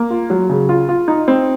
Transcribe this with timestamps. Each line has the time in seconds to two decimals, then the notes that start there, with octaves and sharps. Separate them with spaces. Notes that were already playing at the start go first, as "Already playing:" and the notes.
Already playing: A#3
0.10 F4
0.30 F#3
0.49 C#3
0.69 F4
0.89 F4
1.08 D#4
1.28 C4